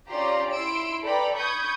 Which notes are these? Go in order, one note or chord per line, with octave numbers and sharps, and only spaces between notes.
C#4 F4 G4 D5 A#5 C6
E4 C6 E6 D7
A4 B4 D5 G5 A#5 B5
B5 C#6 D#6 G6 G#6